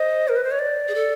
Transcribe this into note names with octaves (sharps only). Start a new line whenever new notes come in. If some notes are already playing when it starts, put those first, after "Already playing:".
Already playing: C5 D#5
A#4
B4
C5
C#5
D5
G#4
A4